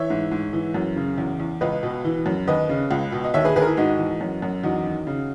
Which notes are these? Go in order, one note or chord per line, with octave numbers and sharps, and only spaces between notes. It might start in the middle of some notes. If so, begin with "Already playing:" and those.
Already playing: E3 C#5 E5
G#2
G#2
E3
F#2
C#3
E2
E2
C#2 B4 D#5
B2
E3
F#2
D#2 B4 D#5
C#3
C#2
B2
D#5
D#2 C#5 E5
G#4 B4
D#2 G#4 B4
A#4
E4 G#4
G#2 D#4 F#4
E3
F#2
F#2
E2 D#4 F#4
D#3
C#3